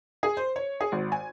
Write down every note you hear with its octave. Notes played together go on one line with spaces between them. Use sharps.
G#4
C5
C#5
G#4
G#1
G#5